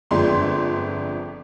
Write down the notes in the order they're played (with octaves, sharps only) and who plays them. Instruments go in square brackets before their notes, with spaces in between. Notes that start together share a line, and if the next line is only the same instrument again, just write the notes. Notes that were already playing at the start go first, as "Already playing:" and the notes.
[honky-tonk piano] G1 F2 G#3 D4 C6